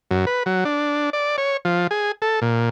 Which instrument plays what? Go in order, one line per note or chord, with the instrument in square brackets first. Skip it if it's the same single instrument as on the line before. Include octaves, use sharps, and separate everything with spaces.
[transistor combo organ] F#2
B4
F#3
D4
D5
C#5
F3
G#4
A4
A#2